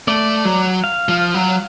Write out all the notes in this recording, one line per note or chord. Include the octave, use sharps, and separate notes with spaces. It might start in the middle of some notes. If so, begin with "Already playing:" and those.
A3 D5
F#3
F5
F3
F#3